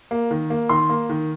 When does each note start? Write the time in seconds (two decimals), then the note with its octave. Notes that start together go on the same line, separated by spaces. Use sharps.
0.11 A#3
0.31 D#3
0.50 A#3
0.69 D#3 C6
0.90 A#3
1.09 D#3